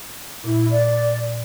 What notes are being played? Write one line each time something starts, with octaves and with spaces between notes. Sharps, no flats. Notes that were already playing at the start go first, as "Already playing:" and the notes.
A#2 E4
D5